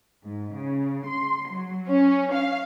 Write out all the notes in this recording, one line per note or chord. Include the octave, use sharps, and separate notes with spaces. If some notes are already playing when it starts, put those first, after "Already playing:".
G#2
C#3
C6
F#3
C#4
F5